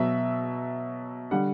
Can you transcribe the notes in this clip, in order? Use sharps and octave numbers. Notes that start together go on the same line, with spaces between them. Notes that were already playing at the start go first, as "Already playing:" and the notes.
Already playing: B2 F#3 E5
D3 G3 F#5